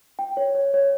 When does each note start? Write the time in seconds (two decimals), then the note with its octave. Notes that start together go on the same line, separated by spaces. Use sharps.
0.19 G5
0.37 C#5
0.55 C#5
0.74 C#5